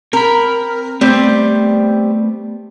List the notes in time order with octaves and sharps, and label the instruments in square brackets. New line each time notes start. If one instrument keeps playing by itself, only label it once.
[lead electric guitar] C4 B5 [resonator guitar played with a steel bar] A#4
[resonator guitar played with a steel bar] G3 C4 [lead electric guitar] A3 B3